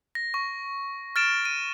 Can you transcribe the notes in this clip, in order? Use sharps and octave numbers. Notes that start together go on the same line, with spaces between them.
A#6
C#6
F6 A6 D7 E7
D#7